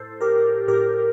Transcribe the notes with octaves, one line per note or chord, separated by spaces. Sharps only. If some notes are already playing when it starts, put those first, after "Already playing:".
Already playing: A2 A4 C5
G4 A#4
A2 G4 A#4